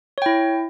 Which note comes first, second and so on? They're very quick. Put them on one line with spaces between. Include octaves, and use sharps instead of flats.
C#5 G5 E4